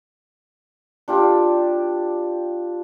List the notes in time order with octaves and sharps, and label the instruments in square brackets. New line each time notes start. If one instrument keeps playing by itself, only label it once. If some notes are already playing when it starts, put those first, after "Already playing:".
[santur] D4 F4 G4 D5